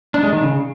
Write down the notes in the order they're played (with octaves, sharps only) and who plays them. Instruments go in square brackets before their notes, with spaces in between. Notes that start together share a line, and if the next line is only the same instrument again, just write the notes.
[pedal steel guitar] D4
G#3
D#3
C#3